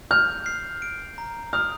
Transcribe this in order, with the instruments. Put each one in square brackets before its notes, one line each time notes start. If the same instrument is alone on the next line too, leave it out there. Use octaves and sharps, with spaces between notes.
[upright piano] F6 [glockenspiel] G6
[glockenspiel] C7
D7
A#5
[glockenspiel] D#6 [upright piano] F6